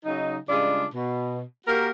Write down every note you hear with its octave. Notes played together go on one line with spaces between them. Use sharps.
C#3 F#3 D#4
C#3 G3 G#3 D4 F4
B2
A#3 F#4 G4 A#4